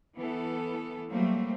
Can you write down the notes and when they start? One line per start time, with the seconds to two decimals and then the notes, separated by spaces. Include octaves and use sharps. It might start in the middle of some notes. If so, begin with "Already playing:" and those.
0.17 E3 B3 A4
1.11 F#3 G3 A3 A#3 C4